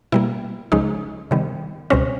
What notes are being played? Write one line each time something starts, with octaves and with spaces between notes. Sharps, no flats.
B2 G3 A#3 E4
C#2 C#3 F3 G#3 C#4 D#4
C3 D#3 G3 B3
C#2 B2 G3 C4 C#4